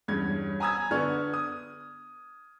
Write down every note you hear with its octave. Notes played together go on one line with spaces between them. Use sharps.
E2 G2 C#4 G#6
G#5 A#5 B5 D#6 E6 G#6
D3 B3 D5 C#6 F6 G#6
D#6